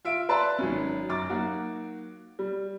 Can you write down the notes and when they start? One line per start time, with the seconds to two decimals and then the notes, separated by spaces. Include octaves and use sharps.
0.05 F4 E5 D7
0.29 B4 D5 E5 A5 B5 C6
0.59 G#1 F#3 C#4
1.09 F#2 D6 A6
1.29 F#3 A#3 D#4 F#4
2.39 G3